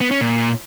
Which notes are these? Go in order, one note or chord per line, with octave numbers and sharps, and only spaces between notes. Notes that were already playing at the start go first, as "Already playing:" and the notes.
B3
C#4
A#2